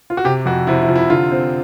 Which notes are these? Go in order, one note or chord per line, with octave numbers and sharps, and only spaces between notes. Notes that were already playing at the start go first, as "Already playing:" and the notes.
F4
F#4
C3 G4
F2 F#4
C3 E4
E4
F3
E4
D3 F4
C4